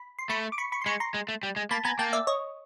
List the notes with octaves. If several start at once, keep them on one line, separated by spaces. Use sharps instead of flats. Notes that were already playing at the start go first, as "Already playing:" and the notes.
Already playing: B5
C6
A3 B5 C#6
D6
B5 C#6
B5 C#6
C6
G#3 B5 C#6
A#5 C6
G#3
A3
G3
G#3
A#3 A5 B5
B3 G#5 A#5
A#3 G5 A5
D5 E5
C#5 D#5